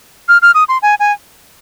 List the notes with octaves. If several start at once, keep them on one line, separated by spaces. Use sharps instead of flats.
F6
F6
D#6
C6
G#5
G#5